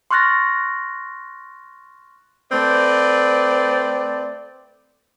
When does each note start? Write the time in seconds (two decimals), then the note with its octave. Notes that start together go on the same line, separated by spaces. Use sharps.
0.11 C6 C#6 F6 F#6 A6 A#6
2.52 A3 C4 B4 D5